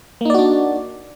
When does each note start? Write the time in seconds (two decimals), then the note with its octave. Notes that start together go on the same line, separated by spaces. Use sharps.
0.21 A#3
0.25 D#4
0.30 D5
0.34 F#4
0.39 D4